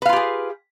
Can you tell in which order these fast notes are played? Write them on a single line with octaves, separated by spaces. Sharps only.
B4 F5 F4 G4 G#4